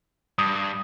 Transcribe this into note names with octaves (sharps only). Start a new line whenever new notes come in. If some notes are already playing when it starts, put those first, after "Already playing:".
G2 D#6